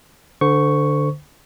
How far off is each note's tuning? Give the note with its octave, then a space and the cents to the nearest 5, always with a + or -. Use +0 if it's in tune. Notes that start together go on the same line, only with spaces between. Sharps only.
D3 +0 C5 -30 C#6 +0